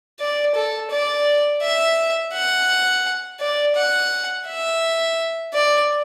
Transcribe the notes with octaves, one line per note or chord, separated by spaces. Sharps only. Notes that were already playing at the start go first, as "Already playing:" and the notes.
D5
A4
D5
E5
F#5
D5
F#5
E5
D5